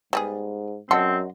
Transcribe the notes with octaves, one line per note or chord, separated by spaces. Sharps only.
G#2 G3 B3 G#4
F#2 C4 A4 D#5 F#5 C6